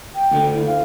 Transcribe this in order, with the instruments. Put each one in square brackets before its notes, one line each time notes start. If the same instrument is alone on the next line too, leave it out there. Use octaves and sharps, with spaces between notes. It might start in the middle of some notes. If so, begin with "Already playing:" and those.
[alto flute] G5
[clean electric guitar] D2 D3
[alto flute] E4
F5